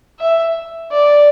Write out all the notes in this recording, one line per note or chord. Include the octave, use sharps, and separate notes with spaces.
E5
D5